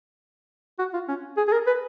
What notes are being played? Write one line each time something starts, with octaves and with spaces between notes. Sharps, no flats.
F#4
F4
C#4
G#4
G#4
A#4
B4